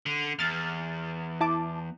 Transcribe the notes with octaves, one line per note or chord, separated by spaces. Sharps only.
D3
E2 F6 A6
E4 A5 D6